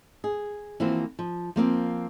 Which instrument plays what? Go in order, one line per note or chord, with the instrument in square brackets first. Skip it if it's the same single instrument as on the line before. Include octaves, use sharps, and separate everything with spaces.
[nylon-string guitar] G#4
E3 F3 A#3 C4 F#4 C5
F3
F3 A#3 C4 F4